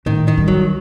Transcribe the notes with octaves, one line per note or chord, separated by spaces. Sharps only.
A2 D#3
D#3
G3
F#3